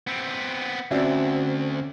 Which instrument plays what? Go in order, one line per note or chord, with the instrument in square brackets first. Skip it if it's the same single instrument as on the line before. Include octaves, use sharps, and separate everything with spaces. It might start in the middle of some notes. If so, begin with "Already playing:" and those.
[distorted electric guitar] B3 C4
[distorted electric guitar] D2 [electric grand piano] C4 C#4 [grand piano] F#4 D5 E5